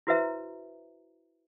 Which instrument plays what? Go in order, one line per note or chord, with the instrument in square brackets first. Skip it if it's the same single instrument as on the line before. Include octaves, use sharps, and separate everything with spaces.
[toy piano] E4 F#4 B4 C5 E5 A#5